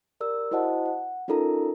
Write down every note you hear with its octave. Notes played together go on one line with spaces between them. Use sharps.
G4 A#4 D5 E6
E4 F#4 C5 D#5 F#5 A5
F#5
C#4 D#4 F4 A4 A#4 A#5